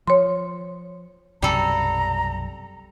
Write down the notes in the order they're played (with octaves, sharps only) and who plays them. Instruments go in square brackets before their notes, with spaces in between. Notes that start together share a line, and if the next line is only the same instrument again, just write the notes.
[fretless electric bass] F3 [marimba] C#5 C6
[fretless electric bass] B1 F#2 C3 [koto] G3 A4 [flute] A#5